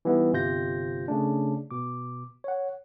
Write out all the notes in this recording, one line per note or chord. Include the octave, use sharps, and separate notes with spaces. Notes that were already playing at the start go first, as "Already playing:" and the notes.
E3 G3 B3 D#4 E4
G1 C3 F4 G6 A#6
C#3 A3 D4
B2 D6
C#5 F#5